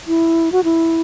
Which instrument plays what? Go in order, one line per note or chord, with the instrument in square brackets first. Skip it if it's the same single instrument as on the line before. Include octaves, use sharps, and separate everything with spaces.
[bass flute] E4
F#4
E4